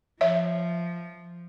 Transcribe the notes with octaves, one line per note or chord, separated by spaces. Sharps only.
F3 C#5 E5